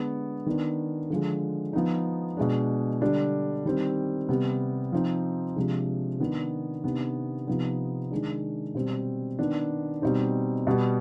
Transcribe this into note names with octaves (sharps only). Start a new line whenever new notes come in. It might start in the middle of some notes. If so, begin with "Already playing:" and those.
Already playing: D3 G#3 B3 D4
D#3 B3 D4
D3 F3 G#3
F3 B3 D#4
B2 G#3 D4
D3 G3 D4
D#3 G3 C4
C3 G3 B3
F3 C4 D#4
C3 F3 G#3 D4
D#3 B3 D4
C3 D#3 B3 D4
C3 F3 B3 D#4
D#3 G#3 D4
B2 G3 C4
D#3 B3 D4
B2 G3 C4 D#4
B2 G3 B3